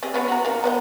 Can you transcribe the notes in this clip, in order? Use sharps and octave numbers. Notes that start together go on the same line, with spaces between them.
C4 G4 G#4
B3 C#4
F#4 A#5
D#3 A#3
B3 D5 G5